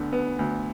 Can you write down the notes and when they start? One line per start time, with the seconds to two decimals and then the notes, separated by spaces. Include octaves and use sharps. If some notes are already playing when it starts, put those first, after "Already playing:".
Already playing: D2 D3 B3
0.13 B3
0.39 D2